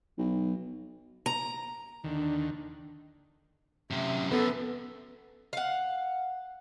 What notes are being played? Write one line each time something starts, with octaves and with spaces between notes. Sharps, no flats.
B1
A#5
D#2 D3 D#3 D4
F#2 C3 E5
F#2 B3 A4
F5 F#5